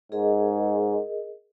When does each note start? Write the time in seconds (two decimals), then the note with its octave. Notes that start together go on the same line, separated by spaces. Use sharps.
0.12 G#2 G#4 A#4 D#5